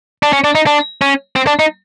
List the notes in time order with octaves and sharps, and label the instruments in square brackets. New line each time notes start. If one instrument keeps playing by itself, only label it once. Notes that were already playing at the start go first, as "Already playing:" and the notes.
[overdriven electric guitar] D4
C#4
D4
D#4
D4
C#4
C4
D4
D#4